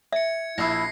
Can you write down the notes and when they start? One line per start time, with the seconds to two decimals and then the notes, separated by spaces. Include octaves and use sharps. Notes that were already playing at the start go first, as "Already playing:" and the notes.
0.12 E5 G#6 C#7
0.58 A#1 E4 E6 A#6 C7